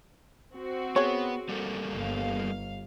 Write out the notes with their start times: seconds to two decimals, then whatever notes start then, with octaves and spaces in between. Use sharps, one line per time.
0.54 C4 F#4
0.96 B3 G#4 C#5
1.49 G3 A#3 A4
1.90 G1 F5